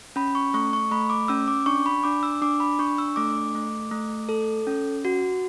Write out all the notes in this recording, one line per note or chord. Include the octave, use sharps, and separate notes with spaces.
C#4 B5
C#6
A3 C#6
C#6
A3 B5
D6
C#4 E6
D6
D4 C#6
B5
D4 D6
E6
D4 D6
B5
D4 C#6
E6
A3 D6
A3
A3
A4
C#4
F#4